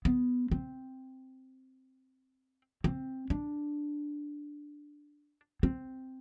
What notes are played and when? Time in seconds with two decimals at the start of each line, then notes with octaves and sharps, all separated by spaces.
0.05 B3
0.51 C4
2.84 C4
3.30 D4
5.63 C4